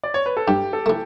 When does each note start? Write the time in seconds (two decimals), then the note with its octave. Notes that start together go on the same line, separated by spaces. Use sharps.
0.04 D5
0.14 C#5
0.26 B4
0.37 A4
0.47 G2 G4
0.73 A4
0.86 E3 A3